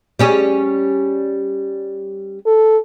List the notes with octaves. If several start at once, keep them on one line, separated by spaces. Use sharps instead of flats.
G3 C#4 G#4
A4